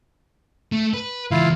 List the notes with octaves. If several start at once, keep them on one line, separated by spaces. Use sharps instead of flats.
A3
B4
C#2 E3 E4 F4 F5